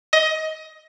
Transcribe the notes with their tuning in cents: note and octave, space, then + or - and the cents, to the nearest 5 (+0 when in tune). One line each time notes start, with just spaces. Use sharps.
D#5 +20